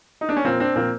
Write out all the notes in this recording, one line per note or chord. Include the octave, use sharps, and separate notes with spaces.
D#4
D4
C#4
A#2 F3 A#3 C4
C4 D4
A#2 F3 A#3 C4